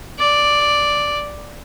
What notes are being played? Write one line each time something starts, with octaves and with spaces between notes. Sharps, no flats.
D5